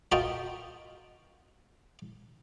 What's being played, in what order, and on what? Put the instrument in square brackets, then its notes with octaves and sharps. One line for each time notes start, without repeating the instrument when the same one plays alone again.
[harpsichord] F4 F#4 A#4 D#5 G5 A5